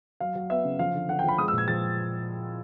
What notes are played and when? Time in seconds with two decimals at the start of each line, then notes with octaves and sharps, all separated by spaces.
0.20 F#3 F5
0.35 F#3
0.50 B3 E5
0.65 C#3
0.79 F3 F5
0.94 D3
1.09 D3 F#5
1.19 G5
1.24 F3 B5
1.38 G#3 D#6
1.48 E6
1.53 A#2 G#6
1.68 F3 A6